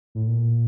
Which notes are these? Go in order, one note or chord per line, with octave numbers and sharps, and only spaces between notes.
A2
A#2